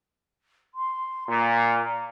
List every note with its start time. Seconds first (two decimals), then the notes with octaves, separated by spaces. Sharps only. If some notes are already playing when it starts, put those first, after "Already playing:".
0.74 C6
1.28 A#2 A#5